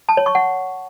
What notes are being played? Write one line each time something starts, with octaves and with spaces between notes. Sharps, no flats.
A5
C#5
C#6
F#5